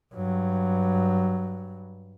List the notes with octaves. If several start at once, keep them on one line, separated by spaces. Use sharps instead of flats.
G2 F#3